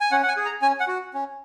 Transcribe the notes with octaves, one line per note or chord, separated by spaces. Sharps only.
G#5
C#4 F#5
F#5
G#5
G#4
A#5
C#4 G#5
F#5
F#4
C#4